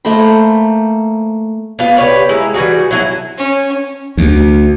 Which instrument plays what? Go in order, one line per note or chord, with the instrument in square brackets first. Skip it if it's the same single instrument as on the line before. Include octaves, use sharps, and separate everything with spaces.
[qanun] A3 A#3 C5 B5
[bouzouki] B3 F4
G4 B4 C#5 D5
G#3 E4 A#5
E3 G3 F#4 G#4
F#3 E4 G#5
[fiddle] C#4
[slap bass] D2